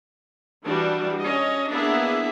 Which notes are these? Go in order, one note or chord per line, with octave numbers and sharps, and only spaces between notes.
E3 G3 D4 F#4
C#4 D#5
A#3 B3 D4 E4 G#4 E5